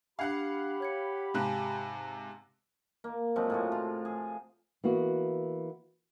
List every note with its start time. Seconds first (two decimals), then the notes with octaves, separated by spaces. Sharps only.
0.19 D4 G4 F5 F#5 B5 F#6 G#6 C7
0.80 C#5 G#6 C#7
1.34 G#2 C3 F5 G#5 A5 F#6
3.04 A#3
3.36 C3 F3 F#3 G#3
3.50 A2 F3 F#4
3.72 F4
4.05 G#4
4.84 E3 A#3 B3 F#4